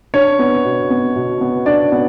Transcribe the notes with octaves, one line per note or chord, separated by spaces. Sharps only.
D4 C#5
B3
B2
B3
B2
B3
D4 D5
B3